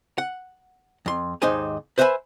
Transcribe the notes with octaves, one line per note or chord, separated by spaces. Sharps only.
F#5
F2 C6
D#2 G#2 D#4 C5 G#5
B4 C5 E5 F#5 G#5 B5